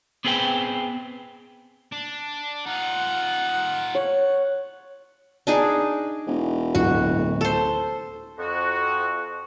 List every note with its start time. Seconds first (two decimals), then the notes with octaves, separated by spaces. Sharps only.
0.25 B3 C4 G#4 B4 G5
1.92 D4
2.66 D#4 F4 F#5
3.95 C#5
5.47 D4 D#4 G#4
6.27 E1
6.75 D1 A2 F#4
7.41 A4 C5 E7
8.39 F2 F#4